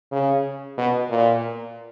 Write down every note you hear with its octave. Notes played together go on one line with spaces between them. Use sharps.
C#3
B2
A#2